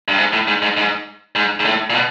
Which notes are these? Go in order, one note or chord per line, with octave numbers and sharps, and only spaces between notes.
G2
G#2
A2
G#2
G#2
G#2
G#2
G#2
A2
A#2
B2